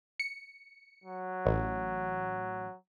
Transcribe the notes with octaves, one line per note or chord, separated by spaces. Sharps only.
C#7
F#3
A1